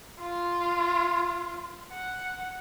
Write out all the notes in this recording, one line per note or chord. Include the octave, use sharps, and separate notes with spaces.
F4
F#5